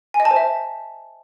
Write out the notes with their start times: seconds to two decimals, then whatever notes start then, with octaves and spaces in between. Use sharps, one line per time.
0.14 G#5
0.20 D#5
0.25 A5
0.31 C5
0.36 E5